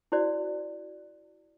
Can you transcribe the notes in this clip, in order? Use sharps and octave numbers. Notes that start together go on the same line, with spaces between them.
E4 F#4 C5 D5